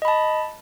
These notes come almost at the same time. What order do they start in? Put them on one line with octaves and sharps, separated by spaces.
D#5 B5 A5